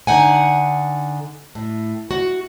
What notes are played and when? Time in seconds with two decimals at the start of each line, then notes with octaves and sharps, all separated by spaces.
0.07 D3 D#4 F#5 G#5
1.55 A2
2.11 F#4